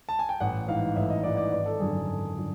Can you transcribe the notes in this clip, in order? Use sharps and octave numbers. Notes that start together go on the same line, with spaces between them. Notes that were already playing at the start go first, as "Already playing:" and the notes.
A5
G#5
G5
A1 F#5
G#2 E3 F5
A1 E5
D#5
G#2 E3 D5
D5
G#1 D5
A4
F#2 D3 F#3 G#4
A4
G#1
D3 F#3